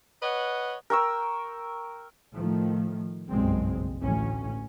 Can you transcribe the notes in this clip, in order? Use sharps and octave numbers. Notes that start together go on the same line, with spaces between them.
B4 C#5 D#5 F#5
A#4 G5 C#6 E6
A2 D#3 F3 A3
F#1 B1 G2 G#3 C4
A1 D2 C#4